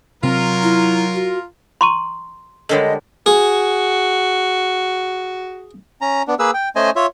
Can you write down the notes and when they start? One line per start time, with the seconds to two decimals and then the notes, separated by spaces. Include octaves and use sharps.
0.23 C3 F#3 C4 F4 A#4
0.63 E4
1.14 F#4
1.81 A#5 C6 C#6 D#7
2.69 D3 G3 G#3 A4 A#4 C#5 D#5
3.26 F#4 G#4
6.01 C#4 A#5
6.28 B3 D4
6.39 A#3 G#4 B4 E6
6.54 G5
6.76 A3 C#4 C5 D#5 G#5
6.96 F4 C#5 E5